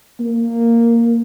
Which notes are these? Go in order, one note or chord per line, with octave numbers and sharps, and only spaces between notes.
A#3